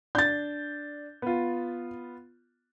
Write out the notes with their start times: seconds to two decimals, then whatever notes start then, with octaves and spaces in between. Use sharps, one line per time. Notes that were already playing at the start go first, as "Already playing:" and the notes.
0.15 D4 G6 A6
1.22 B3 F4